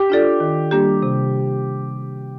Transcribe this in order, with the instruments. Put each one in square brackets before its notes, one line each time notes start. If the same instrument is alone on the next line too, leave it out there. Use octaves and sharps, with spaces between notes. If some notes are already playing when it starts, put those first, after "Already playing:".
Already playing: [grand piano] G4
[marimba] D4 F4 A4 D5
D#3
G3 A#3 D4 G4
C3